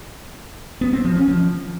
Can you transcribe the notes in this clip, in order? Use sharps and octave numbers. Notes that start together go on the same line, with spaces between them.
B3
C4
F3
C#4
F3